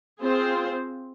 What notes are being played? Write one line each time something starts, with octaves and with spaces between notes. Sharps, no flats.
C4 F4 G#4 C5